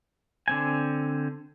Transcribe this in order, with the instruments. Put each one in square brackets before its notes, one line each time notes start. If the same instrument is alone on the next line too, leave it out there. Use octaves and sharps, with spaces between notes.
[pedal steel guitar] D3 C4 G#5